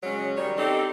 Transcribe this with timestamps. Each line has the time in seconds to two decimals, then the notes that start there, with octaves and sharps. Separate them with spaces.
0.03 C#3 F#3 G#3 C#4
0.35 D#3 G3 C#5
0.56 C4 D#4 G4 A4